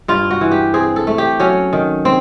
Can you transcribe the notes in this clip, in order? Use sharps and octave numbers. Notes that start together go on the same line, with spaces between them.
G2 F4
F#4
E3
G4
C4 G#4
A4
A3
G4
F#3 C#4
D#3
C4